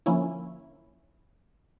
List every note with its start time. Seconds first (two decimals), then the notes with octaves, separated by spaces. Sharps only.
0.06 D3 F3 A#3 C#4 E4